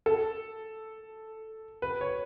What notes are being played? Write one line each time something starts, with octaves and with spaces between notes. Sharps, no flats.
A4
B4
C#5